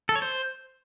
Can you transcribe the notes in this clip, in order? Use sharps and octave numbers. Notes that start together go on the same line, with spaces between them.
A4
C#5
C5